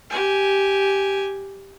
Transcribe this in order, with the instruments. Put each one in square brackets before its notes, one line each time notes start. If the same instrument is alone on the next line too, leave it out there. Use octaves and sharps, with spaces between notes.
[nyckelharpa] G4 G#5